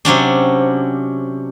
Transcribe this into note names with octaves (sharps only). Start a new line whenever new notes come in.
C3 F#3 C#4 D4